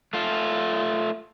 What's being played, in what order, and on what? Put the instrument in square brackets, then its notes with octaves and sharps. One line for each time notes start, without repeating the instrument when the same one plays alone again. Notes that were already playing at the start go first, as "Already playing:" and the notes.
[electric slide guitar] A3 F4